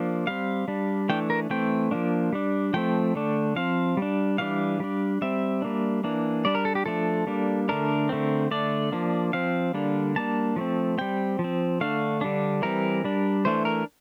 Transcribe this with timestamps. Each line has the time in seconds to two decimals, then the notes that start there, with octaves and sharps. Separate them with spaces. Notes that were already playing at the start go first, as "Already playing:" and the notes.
Already playing: F3 A#3 D4
0.27 G3 C4 F5
0.68 G3 D4
1.09 E3 A3 D4 G5
1.30 A#4
1.50 E3 A3 C4 G5
1.91 F3 A#3 D4
2.33 G3 D4
2.74 F3 A3 C4 G5
3.15 D3 A3 D4
3.56 F3 C4 F5
3.97 G3 D4
4.38 E3 G3 D4 F5
4.80 G3 D4
5.22 G3 C4 E5
5.62 G3 A#3 D4
6.04 E3 A#3 D4
6.45 G3 D4 D5
6.55 A#4
6.65 A4
6.75 G4
6.86 F3 A3 D4 A4
7.27 G3 A#3 D4
7.69 D3 A3 D4 A#4
8.09 D3 A3 C4
8.51 D3 A3 D4 D5
8.92 F3 A#3 D4
9.33 F3 C4 F5
9.74 D3 G3 A#3 D4
10.16 G3 A#3 D4 A5
10.56 F3 A3 C4
10.98 G3 C4 G5
11.39 F3
11.44 C4
11.81 D3 A3 D4 F5
12.21 D3 G3 D4
12.62 E3 G3 C4 A#4
13.04 G3 D4
13.45 E3 A3 D4 C5
13.65 A#4